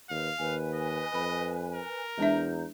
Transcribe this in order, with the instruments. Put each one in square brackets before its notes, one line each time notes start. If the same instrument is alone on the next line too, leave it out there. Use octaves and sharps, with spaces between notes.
[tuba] D#2 [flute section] B4 [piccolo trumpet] F5
[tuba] D#2 [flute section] B4 G#5
[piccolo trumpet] D#5
[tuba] F2 [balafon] B5
[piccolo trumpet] A#4
[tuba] E2 [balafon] G#3 D4 E5 [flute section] A#5 G6